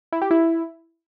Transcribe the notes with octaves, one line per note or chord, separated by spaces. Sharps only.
E4
G4
E4